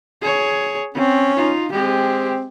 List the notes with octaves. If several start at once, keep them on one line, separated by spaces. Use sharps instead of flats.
G#4 C#5
C4 C#4
D#4 F4
G#3 C4 G4